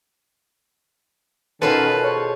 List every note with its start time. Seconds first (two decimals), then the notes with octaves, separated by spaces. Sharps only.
1.62 B2 D#3 C#4 F4 A4 B4
2.03 G#4 C5 C#5